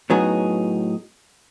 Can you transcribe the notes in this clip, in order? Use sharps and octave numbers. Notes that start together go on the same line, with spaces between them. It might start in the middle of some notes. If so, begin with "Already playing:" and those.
A2 F#3 B3 D#4 G#4